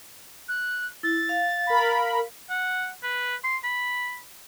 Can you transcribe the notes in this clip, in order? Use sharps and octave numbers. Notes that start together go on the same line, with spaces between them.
F#6
E4 A6
F5
A#4 B5
F#5
B4
C6
B5